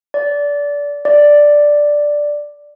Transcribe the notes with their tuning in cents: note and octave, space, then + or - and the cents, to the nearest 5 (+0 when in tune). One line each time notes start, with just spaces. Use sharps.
D5 -25
D5 +0